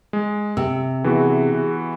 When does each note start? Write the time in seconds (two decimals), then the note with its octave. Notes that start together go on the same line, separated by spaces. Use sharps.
0.13 G#3
0.57 C3 E6
1.04 E3 B3 F#4 G#4